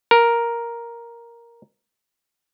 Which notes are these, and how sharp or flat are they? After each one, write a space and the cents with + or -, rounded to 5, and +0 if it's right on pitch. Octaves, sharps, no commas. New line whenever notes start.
A#4 +5